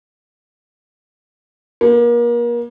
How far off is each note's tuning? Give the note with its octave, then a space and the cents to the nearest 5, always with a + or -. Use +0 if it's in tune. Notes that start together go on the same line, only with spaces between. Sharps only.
A#3 +35